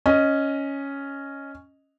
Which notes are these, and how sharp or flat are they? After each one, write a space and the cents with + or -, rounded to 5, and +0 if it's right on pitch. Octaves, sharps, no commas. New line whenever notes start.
C#4 +0 D#5 +0